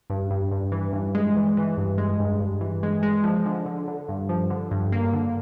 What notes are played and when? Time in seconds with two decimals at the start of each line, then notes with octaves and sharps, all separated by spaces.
0.10 G2
0.31 G2
0.51 G2
0.72 E3
0.93 G2
1.15 G#3
1.36 E3
1.57 E3
1.77 G2
1.98 G#3
2.20 G2
2.40 G2
2.61 E3
2.83 G#3
3.03 G#3
3.24 F3
3.46 D3
3.66 D3
3.88 D3
4.09 G2
4.29 F3
4.50 D3
4.71 G2
4.92 A#3
5.13 D3